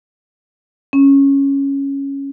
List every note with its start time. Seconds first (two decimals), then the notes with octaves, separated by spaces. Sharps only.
0.93 C#4